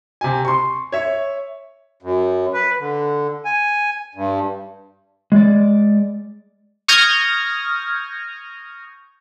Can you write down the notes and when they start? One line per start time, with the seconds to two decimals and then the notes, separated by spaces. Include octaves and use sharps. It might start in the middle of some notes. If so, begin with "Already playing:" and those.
0.21 C3 G#5
0.45 C6 C#6
0.92 C#5 E5
2.02 F#2
2.54 B4
2.79 D3
3.45 G#5
4.15 G2
5.32 G#3 D5
6.88 C#6 D#6 F6 G6 G#6 A#6